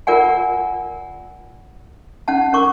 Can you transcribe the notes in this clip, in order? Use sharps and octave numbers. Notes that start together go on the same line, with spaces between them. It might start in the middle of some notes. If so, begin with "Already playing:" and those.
F4 A#4 D5 F#5 G#5
C#4 F#5 A5
C#4 A#4 C#6 D6